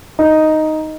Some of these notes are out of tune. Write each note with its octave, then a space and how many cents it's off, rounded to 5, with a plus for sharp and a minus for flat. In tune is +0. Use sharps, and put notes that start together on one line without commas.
D#4 +0